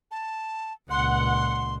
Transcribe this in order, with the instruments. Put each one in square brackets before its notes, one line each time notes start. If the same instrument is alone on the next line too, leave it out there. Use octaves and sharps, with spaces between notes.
[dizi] A5
[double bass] C#2 A#2 [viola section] F#5 [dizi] C6